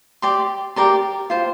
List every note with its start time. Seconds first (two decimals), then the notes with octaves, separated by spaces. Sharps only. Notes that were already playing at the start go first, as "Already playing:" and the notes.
0.22 G4 D5 C6
0.76 G4 A#4 D5 C6
1.30 F4 C5